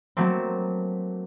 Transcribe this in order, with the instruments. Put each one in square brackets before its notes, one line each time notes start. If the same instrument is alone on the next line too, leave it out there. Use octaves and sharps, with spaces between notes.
[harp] F#3 A3 A#3 C4